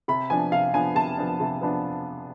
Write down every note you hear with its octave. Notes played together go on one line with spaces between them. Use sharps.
C3 B5
F3 B3 D4 G#5
C3 F5
F3 B3 D4 G#5
C3 A5
F3 B3 D4
C3
F3 B3 D4